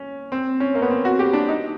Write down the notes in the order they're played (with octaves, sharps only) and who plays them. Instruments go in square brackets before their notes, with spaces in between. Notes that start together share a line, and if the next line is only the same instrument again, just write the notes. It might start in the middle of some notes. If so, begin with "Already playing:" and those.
Already playing: [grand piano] C#4
C4
C#4
A#3
B3
C4
F#4
G4
D4
D#4